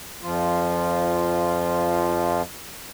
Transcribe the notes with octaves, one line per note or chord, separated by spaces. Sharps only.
F2 F3 F4